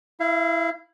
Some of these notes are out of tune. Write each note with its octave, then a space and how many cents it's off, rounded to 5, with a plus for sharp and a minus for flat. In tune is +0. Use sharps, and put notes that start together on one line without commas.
E4 +0 F5 -35